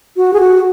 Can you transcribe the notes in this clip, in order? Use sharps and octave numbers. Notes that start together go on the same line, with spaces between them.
F#4
G#4
F#4